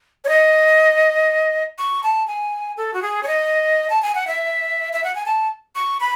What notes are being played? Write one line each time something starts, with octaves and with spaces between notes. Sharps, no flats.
C#5
D#5
C#6
A5
G#5
A4
F#4
G#4
C#5
D#5
A5
G#5
F#5
E5
E5
F#5
G#5
A5
C#6
B5